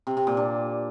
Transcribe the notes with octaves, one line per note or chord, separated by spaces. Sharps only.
C3
C3
A#2
D4